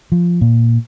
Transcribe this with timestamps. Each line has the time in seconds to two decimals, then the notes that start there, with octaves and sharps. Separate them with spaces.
0.12 F3
0.41 A#2